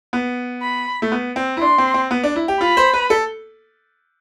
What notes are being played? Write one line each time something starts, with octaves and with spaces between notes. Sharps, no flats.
B3
B5
A3
B3
C4
E4
D4 C6
C4
C4
B3
D4
E4
G4
F4 B5
C5
B4
A4